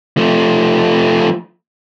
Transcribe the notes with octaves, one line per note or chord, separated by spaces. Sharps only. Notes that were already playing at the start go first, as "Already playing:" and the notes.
F3 A3